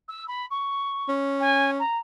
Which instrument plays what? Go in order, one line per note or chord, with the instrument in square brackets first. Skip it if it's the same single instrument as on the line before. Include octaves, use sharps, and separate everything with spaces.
[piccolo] E6
B5
C#6
[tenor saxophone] C#4
[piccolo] G#5
A#5